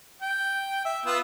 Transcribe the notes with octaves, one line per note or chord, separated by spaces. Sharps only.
G5
E5
B3 F4 E6